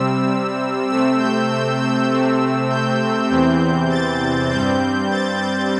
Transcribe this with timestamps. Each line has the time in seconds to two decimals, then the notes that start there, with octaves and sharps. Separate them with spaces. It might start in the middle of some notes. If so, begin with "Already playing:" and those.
Already playing: C3 G3 C4 E6
0.89 C3 A3 C4 E6
1.19 G6
1.50 E6
1.80 E6
2.10 C3 A3 C4
2.70 G6
3.29 E2 C3 E3 C4
3.90 A6
4.50 G2 G3 C4 G6
5.11 A6
5.41 G6